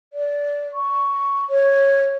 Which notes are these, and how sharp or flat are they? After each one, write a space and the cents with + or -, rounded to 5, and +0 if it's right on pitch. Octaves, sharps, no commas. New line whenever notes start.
D5 -20
C#6 +5
C#5 -10